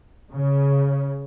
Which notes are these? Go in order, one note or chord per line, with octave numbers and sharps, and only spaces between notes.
C#3